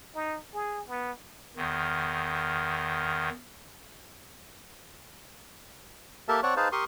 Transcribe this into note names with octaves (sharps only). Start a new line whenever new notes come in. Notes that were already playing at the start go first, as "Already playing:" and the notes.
D#4
G#4
B3
E2 D#3
A#3 G4 A4 A#4 E5 A5
C4 C#5 D5 F#5 A5 C#6
D#4 G#4 B4 C5 F5 A5
G4 A#4 C6 C#6 D#6